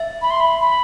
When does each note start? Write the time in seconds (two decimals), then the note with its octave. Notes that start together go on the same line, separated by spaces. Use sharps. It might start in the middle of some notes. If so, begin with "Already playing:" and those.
Already playing: E5
0.22 B5
0.30 C6
0.40 B5
0.60 B5